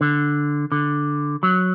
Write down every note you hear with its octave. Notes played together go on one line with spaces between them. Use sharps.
D3
D3
F#3